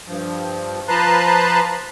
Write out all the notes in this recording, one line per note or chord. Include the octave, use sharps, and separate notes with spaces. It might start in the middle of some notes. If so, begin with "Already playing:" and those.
G2 F3
F3 B4 A5 A#5 C6 F#6